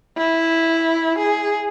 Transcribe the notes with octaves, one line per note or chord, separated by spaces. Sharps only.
E4
G#4